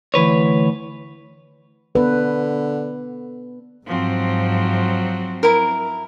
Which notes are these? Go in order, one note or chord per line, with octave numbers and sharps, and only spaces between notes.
D2 E3 B4 C#5
D3 B3 B4
G#2 F3 F#3 C4
E4 A#4